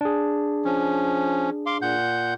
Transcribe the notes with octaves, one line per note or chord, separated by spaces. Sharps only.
D4 G#4
F3 C#4
F5 C6 D6
A#2 F#5 G6